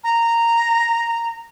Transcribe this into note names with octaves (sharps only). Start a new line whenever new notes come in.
A#5